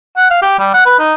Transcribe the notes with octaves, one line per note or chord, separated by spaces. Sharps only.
F#5
F5
G4
G3
F#5
B4
D#4